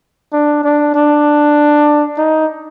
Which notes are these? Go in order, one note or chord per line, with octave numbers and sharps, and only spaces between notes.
D4
D4
D4
D#4